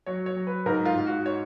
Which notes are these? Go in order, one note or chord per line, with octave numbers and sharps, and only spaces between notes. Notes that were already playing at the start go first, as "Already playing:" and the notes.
F#3 C#5
C#5
F#3
B4
G#2 A#4
F4
G#2
F#4
C#5